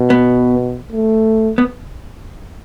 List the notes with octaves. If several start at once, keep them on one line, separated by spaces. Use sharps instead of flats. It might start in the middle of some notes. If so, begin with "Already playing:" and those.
Already playing: B2
B3
A3
B3